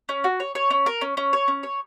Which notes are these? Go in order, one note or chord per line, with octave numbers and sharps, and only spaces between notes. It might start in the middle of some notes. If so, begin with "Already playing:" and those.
C#4
F#4
C#5
C#5
C#4
A#4
C#4
C#4
C#5
C#4
C#5